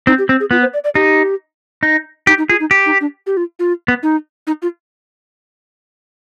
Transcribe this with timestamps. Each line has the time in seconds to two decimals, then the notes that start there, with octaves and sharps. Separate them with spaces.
0.07 C4 D#4
0.18 G4
0.29 C4
0.40 G#4
0.51 B3 F4
0.62 C5
0.74 D5
0.84 D5
0.95 D#4 G4
1.83 D#4
2.27 D#4 G4
2.38 D#4
2.49 F4 G#4
2.60 D#4
2.71 G4
2.86 D#4
3.01 D4
3.26 G4
3.37 F4
3.59 F4
3.88 B3
4.03 D#4
4.47 D#4
4.62 F4